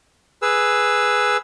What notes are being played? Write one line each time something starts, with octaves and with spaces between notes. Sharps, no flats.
G#4 B4 E6